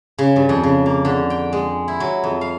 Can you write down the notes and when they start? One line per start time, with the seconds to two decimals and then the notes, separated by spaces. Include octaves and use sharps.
0.18 C#3
0.36 G2
0.49 F2
0.63 C#3
0.86 A#3
1.05 D3
1.30 G5
1.53 G#3
1.88 E4
2.00 F#3
2.24 F2
2.41 F5